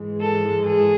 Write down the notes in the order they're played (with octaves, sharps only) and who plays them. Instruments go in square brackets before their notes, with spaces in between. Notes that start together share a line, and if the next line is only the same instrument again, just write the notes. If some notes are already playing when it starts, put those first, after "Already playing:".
Already playing: [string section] G#2 E3 G#3
[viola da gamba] A4
G#4